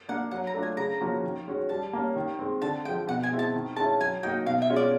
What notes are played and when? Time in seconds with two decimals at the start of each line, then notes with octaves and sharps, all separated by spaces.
0.09 A#3 D4 F#5
0.31 F#3 F#5
0.47 A#5
0.54 A3 D4 F4
0.63 G#5
0.77 C#3 A#5
1.01 F3 A#3 C#4 F#4
1.23 D#3
1.47 G#3 C#4 F#4
1.69 G3 A5
1.93 A#3 C#4
2.16 D#3
2.39 G#3 C4
2.62 D3 A5
2.85 G#3 G5
2.89 F3
3.07 B2 F#5
3.23 G#5
3.31 G#3 C4 E4
3.39 A5
3.54 D#3
3.76 G#3 A5
3.79 C#4 E4
4.00 F#3 G#5
4.23 A#3 D#4 F#4 G5
4.46 B2 F5
4.62 E5
4.70 G#3 C#4 F4
4.76 D5